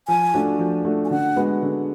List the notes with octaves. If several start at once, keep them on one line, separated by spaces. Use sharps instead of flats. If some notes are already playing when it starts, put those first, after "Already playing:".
F3 G#5
A3 D4 F#4
F3
A3 D4 F#4
G#5
D3 F#5
G#3 B3 F#4
D3